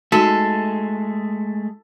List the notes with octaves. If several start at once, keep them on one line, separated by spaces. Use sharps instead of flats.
G#3 A3 D#4 F#4 A4